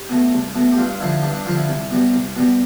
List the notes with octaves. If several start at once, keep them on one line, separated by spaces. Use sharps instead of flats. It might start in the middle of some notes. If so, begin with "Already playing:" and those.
Already playing: G4
B2 A3
C2
B2 A3
G4
G2 F4
D3 F3 E4
G2 D4
D4
D3 F3 F4
E4
C2
B2 G3
C2
B2 G3